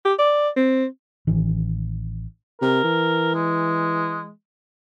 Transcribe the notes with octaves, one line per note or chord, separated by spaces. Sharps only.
G4
D5
C4
A1 D#3 E3
C3 A#4
E3
G#3